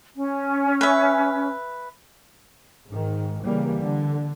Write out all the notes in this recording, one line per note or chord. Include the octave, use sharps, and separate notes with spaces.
C#4
B4 E5
G#2 D#3
C#3 E3 G3 A#3
D3